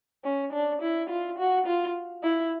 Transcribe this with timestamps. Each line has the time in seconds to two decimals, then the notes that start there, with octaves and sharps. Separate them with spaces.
0.24 C#4
0.53 D4
0.82 E4
1.09 F4
1.38 F#4
1.67 F4
2.24 E4